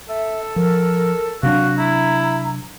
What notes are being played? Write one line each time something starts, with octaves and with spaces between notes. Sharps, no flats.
A4 E5
F3 A#4
C3 F#3 D4 F#4 F5
E4 A#5